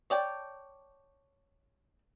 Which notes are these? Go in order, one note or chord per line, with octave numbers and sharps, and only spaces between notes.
C#5 D5 G5 A5